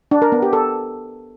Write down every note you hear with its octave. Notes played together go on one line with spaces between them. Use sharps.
D4
A#4
B3
G4
A4